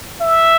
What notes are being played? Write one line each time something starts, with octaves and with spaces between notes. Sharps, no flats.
E5